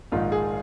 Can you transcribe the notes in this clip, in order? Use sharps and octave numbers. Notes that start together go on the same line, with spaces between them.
A#1 G#2 D#3 F4
G#4